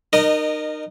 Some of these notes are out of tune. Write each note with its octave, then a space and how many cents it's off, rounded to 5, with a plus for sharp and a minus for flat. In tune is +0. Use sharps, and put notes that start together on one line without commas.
D#4 -30 A#4 +0 D#5 -15